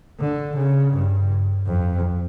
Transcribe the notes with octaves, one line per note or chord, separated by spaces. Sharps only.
D3
C#3
G2
F2